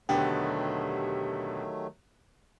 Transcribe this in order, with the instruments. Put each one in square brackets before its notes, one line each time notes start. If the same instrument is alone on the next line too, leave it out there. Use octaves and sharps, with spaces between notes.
[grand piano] E1 D3 B3 [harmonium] D#3 F#3 A3 [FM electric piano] G4